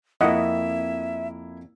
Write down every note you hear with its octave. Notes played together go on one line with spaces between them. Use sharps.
F2 A#3 E4 D#5 E5 F#5